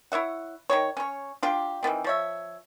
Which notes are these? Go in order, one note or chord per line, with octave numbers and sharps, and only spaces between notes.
E4 C#5 E5 F#5
D#3 G#3 C#5
C#4 C#5
D4 F4 G4
D#3 E3 B3 C4
F3 C#5 E5